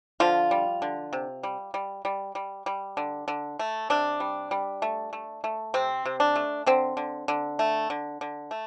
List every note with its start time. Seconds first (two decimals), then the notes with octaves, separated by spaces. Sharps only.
0.20 D3 F3 F4
0.51 G3
0.82 D3
1.13 C3
1.43 G3
1.74 G3
2.05 G3
2.35 G3
2.66 G3
2.97 D3
3.28 D3
3.59 A3
3.90 C3 D4
4.20 G3
4.51 G3
4.82 A3
5.13 A3
5.44 A3
5.74 C3 C4
6.05 C3
6.20 D4
6.36 A3
6.66 D3 C4
6.97 D3
7.28 D3
7.59 A3
7.90 D3
8.21 D3
8.51 A3